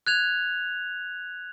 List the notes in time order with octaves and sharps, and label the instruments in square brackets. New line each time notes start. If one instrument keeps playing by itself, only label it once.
[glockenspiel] F#6 G#6 F7